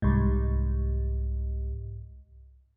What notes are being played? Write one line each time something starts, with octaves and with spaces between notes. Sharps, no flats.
C2 G#2